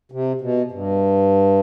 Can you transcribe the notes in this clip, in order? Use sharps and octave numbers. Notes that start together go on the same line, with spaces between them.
C3
B2
G2